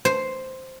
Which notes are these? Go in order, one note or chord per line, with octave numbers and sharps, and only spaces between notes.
C5